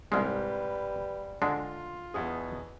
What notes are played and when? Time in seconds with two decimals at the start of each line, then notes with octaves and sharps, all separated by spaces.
0.12 C2 G#2 G3 G#3 B4 F6
1.42 D3 G#3 D4 F4
2.14 E2 B2 G#4